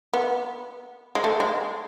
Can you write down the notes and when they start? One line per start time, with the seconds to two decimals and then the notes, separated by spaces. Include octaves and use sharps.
0.13 B3
1.15 G#3
1.24 A3
1.40 G#3